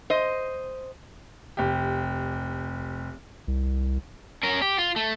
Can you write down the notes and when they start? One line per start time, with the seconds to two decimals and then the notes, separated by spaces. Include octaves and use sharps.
0.10 C5 D#5
1.57 F1 G4
3.48 C2
4.43 C#4 A#4
4.62 G4
4.78 F4
4.96 A3